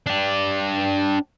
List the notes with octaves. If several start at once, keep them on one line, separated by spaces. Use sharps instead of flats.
D4 G4